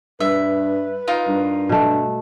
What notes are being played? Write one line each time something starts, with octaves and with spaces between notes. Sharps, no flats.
G2 B4 E5
D#4 F4 A#4
G2
B2 A3